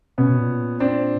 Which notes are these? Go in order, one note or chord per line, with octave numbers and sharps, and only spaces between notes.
B2 B3 C#4
B2
A#2
C4 D4